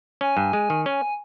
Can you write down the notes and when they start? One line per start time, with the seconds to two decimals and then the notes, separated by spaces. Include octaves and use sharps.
0.21 C#4 G#5
0.37 G2
0.53 G#3
0.70 D#3
0.85 C#4 G#5